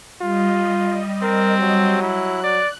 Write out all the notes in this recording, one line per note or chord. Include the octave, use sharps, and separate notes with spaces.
G3 F4 D#5
C4 A#4
F#3
E4 F#6
D5